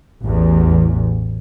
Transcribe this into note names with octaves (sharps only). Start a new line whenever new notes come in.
A1 E2